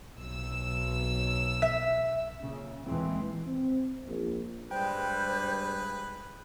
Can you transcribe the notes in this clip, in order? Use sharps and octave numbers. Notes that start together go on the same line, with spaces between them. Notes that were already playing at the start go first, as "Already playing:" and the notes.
B1 E6
E5
A#2 C#3
D#2 A#2 E3 G#3 C4
C4
A#1
G2 G3 G#3 B4 C5 G5